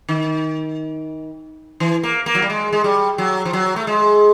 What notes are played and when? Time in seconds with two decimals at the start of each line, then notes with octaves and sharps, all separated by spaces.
0.09 D#3
1.80 E3
2.03 A#3
2.26 A#3
2.35 F#3
2.42 G3
2.50 G#3
2.73 G#3
2.84 G3
3.18 F#3
3.45 F3
3.53 F#3
3.76 A3
3.87 G#3